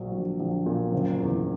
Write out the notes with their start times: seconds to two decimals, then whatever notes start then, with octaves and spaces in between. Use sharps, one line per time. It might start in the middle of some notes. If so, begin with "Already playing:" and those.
Already playing: A#1 A#2 F#3
0.12 A#1
0.40 A#1
0.66 A#2
0.92 F#1
1.20 E2